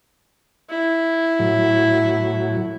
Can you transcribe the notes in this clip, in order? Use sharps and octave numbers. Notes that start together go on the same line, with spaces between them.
E4
A2 F#3